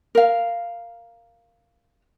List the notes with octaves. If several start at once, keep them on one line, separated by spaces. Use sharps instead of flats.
A#4 F5